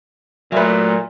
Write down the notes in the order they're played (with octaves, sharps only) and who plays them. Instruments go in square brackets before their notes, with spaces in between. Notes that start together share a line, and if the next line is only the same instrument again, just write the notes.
[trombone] A#2 [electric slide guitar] F#3 A3 [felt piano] B4 E5